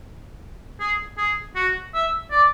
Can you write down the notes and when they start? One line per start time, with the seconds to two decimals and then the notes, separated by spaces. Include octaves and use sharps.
0.80 G#4
1.17 G#4
1.56 F#4
1.93 E5
2.31 D5